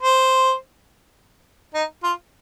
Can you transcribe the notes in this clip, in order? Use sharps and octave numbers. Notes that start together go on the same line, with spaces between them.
C5
D#4
F4